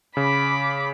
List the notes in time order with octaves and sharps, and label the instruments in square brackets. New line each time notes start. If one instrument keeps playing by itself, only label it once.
[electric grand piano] C#3 [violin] B5 D6